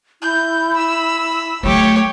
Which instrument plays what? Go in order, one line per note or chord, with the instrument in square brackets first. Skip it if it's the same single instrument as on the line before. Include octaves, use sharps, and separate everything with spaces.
[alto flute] E4 [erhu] G6
[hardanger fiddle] B5 [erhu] E6
[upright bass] F#3 A3 [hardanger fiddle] G4 C#5